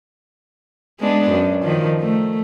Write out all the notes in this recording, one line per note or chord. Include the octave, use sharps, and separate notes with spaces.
G#3 B3 D4
F#2
D#3 F3
A3